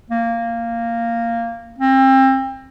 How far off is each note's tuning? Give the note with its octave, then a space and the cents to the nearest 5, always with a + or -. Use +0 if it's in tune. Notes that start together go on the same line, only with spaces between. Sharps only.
A#3 -10
C4 +30